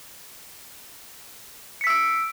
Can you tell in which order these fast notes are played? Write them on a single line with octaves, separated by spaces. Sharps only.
C#7 B6 E6 D7